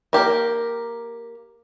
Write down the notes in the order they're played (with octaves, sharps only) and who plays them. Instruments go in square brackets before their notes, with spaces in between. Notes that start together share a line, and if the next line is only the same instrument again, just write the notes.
[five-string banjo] A#3 G4 A#4